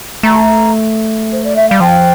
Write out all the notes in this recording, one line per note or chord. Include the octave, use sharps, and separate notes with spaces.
A3 A#5
C5
D5
E5
G3 F5
F3 G5